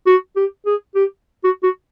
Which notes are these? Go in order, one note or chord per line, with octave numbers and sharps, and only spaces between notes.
F#4
G4
G#4
G4
F#4
F#4